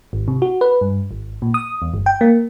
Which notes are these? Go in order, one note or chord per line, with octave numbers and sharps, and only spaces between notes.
G#1
C3
F#4
B4
G2
G#1
A#2
D#6
E2
G1
G5
A#3